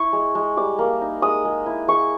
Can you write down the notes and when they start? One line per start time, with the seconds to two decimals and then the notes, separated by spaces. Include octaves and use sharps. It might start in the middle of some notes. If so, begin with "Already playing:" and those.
Already playing: E4 C#6
0.13 G#3
0.35 G#3
0.57 G3 D6
0.79 A#3
1.01 D#4
1.22 G#3 D#6
1.45 G#3
1.66 E4
1.88 G#3 C#6